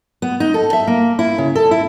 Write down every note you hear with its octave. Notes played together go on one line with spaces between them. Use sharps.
B3
D#4
A4
E5
A#3
E4
C#3
A4
E4